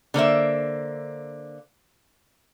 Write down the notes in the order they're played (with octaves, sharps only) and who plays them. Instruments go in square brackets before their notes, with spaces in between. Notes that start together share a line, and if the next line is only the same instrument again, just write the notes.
[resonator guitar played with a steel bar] D3 A#3 C5 E5